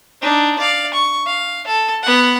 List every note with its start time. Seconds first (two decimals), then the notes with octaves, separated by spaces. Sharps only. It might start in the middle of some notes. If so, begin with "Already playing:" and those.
0.22 D4 D#4
0.59 D5 F5
0.94 C#6
1.27 F5
1.67 A4
2.03 B3 F#5